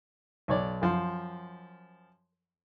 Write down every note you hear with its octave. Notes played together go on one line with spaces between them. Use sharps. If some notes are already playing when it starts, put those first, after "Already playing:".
B1 C#5 D5
F#2 F3 C6